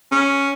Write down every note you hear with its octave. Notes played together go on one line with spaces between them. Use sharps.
C#4